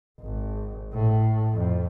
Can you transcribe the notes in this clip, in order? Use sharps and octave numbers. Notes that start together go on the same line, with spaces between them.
G#1
A2
F2